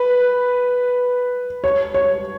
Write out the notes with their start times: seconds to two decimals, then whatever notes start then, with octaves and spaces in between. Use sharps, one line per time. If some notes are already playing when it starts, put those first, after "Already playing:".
Already playing: B4
1.64 C#5
1.94 C#5